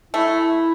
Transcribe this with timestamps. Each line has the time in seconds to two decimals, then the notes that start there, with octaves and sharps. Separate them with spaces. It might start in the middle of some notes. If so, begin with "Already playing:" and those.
0.13 A3 E4